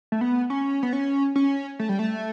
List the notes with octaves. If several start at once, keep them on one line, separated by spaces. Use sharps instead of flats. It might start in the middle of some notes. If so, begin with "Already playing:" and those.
A3
B3
C#4
B3
C#4
C#4
A3
G3
A3